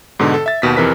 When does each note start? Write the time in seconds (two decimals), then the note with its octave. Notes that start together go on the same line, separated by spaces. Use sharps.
0.19 G#2 B2 D3
0.34 A4
0.46 E5 A6
0.62 D#2 B2 B6
0.76 F2 C3 E3 A#4 B4 B6